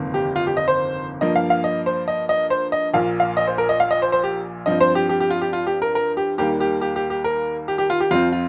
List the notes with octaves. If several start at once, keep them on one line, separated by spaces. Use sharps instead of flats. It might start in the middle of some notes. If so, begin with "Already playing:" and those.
Already playing: G1 F2 C3 D#3 A#3
G4
F4
G4
D#5
C5
G2 F3 A#3 D#5
F5
F5
D#5
C5
D#5
D#5
C5
D#5
A#1 A#2 A#3 F5
F5
D#5
C5
A#4
D#5
F5
D#5
C5
C5
G4
G2 F3 C4 D#5
C5
G4
G4
G4
F4
G4
F4
G4
A#4
A#4
G4
D#2 D#3 G3 A#3 G4
G4
G4
G4
G4
A#4
G4
G4
F4
G4
F2 F3 C4 F4
F4